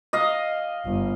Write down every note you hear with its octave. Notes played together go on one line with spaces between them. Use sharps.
D#5 F5
G1